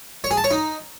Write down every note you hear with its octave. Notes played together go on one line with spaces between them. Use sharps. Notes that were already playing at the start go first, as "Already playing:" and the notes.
C#5
G#4
A5
C#5
D#4